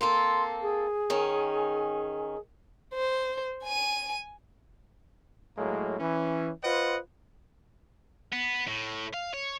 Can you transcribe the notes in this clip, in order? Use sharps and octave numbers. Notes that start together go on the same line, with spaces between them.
A#3 C4 A4 C6
G#4
D#3 C#4
C5
G#5 D#7
A2 F#3 G#3 A#3
E3 C#4
F4 B4 C5 D#5 F#5
B3
A2
F5
C#5